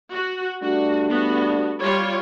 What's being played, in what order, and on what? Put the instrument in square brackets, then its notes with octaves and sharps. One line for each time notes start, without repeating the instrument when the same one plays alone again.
[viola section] F#4
[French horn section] G3 A3 D4 [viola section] F#4
[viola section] B3 F#4
G3 F4 C#5